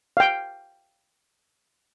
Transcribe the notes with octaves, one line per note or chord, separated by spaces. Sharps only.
F5 G5